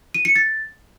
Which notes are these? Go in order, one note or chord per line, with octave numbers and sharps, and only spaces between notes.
D#7
C#7
A6